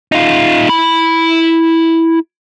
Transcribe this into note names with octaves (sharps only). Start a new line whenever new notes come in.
D#4 F4
E4 B5